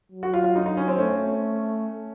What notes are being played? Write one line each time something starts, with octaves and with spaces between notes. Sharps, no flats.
F#3
F#4
F4
F4
D#4
D#4
C#4
C4
A3 C#4